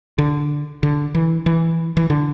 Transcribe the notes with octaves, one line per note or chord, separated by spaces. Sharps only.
D3
D3
E3
E3
E3
D3